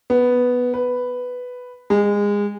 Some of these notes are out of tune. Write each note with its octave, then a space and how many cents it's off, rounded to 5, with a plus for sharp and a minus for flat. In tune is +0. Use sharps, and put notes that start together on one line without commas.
B3 +0
B4 +5
G#3 -25